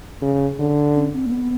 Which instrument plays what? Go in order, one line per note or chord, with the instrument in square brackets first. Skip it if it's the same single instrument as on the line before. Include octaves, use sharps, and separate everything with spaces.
[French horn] C#3
D3
[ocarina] C#4
C4
A#3
B3